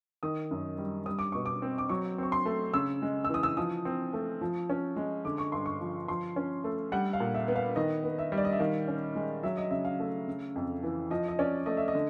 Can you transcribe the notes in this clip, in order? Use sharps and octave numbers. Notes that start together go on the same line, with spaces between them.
D#3 D#6
F#2
G3
G3 D#6
D6
B2 C#6
D6
C4
D6
F#3 C#6
C4 C#6
C6
A3
C#3 E6
G#3
E6
E3 D#6
E6
F3 D#6
C4
A3
F3
C#4
G#3
D3 D6
C#6
G2 C6
C#6
F3
F3 C6
C#4
A3
G3 F#5
F5
A#2
E5
B3
F5
D#3 D#5
B3
E5
G3
D5
D#5
E5
D#3 F5
C#4
G#3
F#3 E5
D#5
C#3 E5
F5
A3
C#3
F2
E3
F3 D#5
D#5
C#4 D5
A3 D#5
E5
D#5
D3